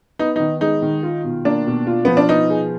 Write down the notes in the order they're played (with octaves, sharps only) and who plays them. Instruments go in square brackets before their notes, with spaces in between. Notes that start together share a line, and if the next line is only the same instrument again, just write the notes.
[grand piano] B3 [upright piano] D#4
[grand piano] D#3 [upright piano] D#4
[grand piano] G#3 [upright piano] D#4
[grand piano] D#3
F4
B2
[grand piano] A#3 [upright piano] D4
[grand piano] B2
F4
[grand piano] F3 [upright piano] B3
[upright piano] D4
[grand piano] B3 [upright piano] D#4
[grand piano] G#4